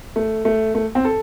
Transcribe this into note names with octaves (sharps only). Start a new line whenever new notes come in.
A3
A3
A3
C4
A4